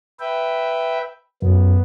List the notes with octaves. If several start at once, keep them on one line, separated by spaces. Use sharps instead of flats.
B4 E5 G5
F#2 B3